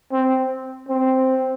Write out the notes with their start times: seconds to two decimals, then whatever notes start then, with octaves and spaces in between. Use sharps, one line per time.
0.12 C4
0.89 C4